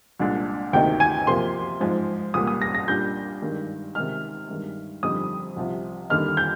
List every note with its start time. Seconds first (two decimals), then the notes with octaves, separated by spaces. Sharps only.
0.20 C2 A#2 G#3 D4
0.73 D2 C3 D#3 A#3 D#4 G5
1.00 G#5
1.27 C3 F3 A#3 C6
1.81 G#2 F3 G#3
2.34 C2 A#2 G3 A#3 D#6
2.47 D#6
2.62 A#6
2.75 A#6
2.88 A#2 G3 D4 G6
3.42 G2 D#3 G#3
3.95 C3 D#3 G#3 D#4 F6
4.49 G2 D#3 G#3
5.03 F2 D3 G3 C4 D#4 D#6
5.56 C2 C3 F3
6.10 D#2 D3 G3 A#3 D#4 F6
6.37 G6